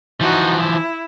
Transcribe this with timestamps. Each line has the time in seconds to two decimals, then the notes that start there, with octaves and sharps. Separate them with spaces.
0.21 E3 F3 D#4 F#4
0.58 E4